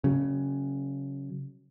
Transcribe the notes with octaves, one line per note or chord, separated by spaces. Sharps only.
C#3 F#3